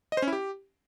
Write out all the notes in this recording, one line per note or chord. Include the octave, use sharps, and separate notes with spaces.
D#5
C5
C#4
E4
G4